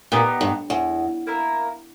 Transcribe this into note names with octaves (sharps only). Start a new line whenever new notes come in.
A#2 B3 D#4 G4
G2
E2
A#3 E4 A#4